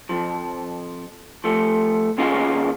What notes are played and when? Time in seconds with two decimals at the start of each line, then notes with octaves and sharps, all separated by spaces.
0.09 F2 F3
1.44 F3 A3
2.18 D#2 C#4 F4 G#4 D#5 F5